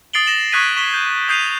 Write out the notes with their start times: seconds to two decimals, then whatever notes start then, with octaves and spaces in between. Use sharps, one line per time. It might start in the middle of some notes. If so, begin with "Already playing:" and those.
0.13 D#6 A6 C7 D7 F#7 G7
0.27 A#6 E7 F#7
0.52 C#6 D#6 F#6 G#6 B6 D#7
0.77 C#6 B6 E7 G7
0.94 G6
1.29 D#6 G6 C7 D#7 F7